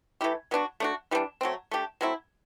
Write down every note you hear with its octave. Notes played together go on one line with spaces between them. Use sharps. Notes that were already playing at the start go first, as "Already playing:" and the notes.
E3 A3 E4 G4
F#3 B3 D4 F#4
A3 D4 F#4
E3 G3 D4
F#3 A3 C4
A3 D4 G4
F#3 A3 C4 E4